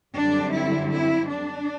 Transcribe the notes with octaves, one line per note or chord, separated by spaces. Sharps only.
F#2 D3 G3 C4 D4
E4
E4
D4